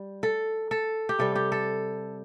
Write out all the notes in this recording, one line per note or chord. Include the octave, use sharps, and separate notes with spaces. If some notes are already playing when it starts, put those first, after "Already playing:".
Already playing: G3
A4
A4
G4
C3 G3 A4
G4
A4